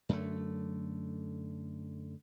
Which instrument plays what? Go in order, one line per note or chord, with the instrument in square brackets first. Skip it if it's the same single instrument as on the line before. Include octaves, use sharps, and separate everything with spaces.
[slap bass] F#2 D3 A3